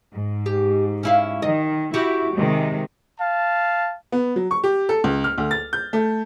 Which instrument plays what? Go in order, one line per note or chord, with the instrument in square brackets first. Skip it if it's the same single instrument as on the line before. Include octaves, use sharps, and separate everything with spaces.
[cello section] G#2
[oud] G4
C#4 E4 F5
[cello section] D#3 [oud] D#5
[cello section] E4 [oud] F#4 G4
[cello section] C3 D#3 G#3
[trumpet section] F5 A5
[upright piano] B3
F#3
C#6
G4
A4
C#2
F6
D2
A6
G6
A3